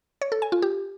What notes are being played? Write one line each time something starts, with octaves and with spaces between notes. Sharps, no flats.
C#5
A4
G#5
F4
G4